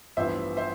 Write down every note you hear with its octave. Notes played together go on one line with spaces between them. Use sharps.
A1 G2 F3 B3 C5 E5
C5 E5